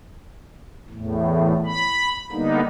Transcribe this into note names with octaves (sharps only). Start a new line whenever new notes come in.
E2 A2
B5
D3 G3 A#3 B3 D#4